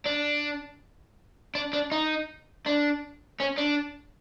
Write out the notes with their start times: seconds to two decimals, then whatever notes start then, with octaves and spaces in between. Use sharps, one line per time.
0.06 D4
1.55 D4
1.73 D4
1.92 D#4
2.66 D4
3.40 C#4
3.58 D4